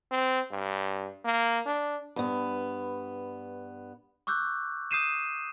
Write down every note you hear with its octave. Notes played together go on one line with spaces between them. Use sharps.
C4
G2
A#3
D4
G2 B3
C#6 D6 E6 F#6 G6
D#6 G6 C7 D#7 E7